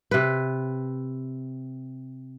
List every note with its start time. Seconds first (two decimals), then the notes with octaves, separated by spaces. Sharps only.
0.11 C3 B4